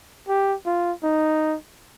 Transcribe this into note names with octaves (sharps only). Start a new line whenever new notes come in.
G4
F4
D#4